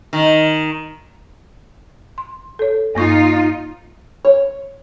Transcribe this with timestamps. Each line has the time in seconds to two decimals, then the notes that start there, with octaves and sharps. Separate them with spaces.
0.13 D#3
2.18 C6
2.59 A4 C#5
2.95 G2 A#3 D#4 F4 C#6
4.25 C#5